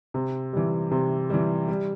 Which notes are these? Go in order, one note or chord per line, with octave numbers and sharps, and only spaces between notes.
C3
E3 G3
C3
E3 G3
G3